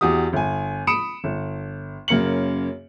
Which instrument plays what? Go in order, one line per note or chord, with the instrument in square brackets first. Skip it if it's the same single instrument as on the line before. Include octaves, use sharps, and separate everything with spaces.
[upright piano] E2 F#4 G4 D#6
G1 G#5
B5 D#6 C#7 D7 E7
G1
F#2 C#3 A#3 C#7 F#7